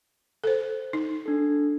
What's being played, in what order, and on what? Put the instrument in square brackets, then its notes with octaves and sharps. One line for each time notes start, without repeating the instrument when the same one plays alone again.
[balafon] A4 C5
D#4
[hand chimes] D4 A4